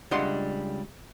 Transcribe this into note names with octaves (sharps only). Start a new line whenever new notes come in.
C#2 G3 D4 D#5 F#5 C6